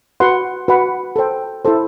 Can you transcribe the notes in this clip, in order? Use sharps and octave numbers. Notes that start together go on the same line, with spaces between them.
F#4 B4 F#5 C6
F#4 B4 F#5 B5
A4 C5 G5
E4 A4 C5